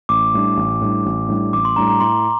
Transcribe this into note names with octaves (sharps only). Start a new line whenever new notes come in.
A1 D6
A2 G3 D4
A1
A2 G3 D4
A1
A2 G3 D4
A1 D6
C6
A2 G3 D4 A#5
A#5
A2 C6